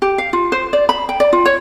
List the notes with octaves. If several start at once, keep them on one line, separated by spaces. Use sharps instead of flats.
G4
F5
F4
C5
D5
B5
G5
D5
F4
C#5